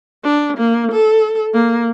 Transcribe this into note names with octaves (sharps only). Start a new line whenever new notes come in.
D4
A#3
A4
A#3